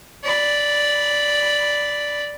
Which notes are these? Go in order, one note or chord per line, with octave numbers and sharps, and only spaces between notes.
D5 B5